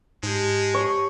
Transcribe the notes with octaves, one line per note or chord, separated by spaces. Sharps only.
G#2 G#3 G4 A5
C#5